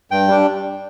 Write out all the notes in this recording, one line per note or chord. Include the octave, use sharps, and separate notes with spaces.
G2 G5
G3 D4